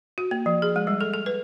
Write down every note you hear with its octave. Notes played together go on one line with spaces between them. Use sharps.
F#4
A#3
F3
G#4
G#3
G3
A4
A4
B4